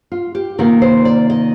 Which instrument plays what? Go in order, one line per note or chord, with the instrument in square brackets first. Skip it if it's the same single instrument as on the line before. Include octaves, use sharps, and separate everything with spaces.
[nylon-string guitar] F4
G4
C3 D#3 A#3 F4 A#4
C5
D5
D#5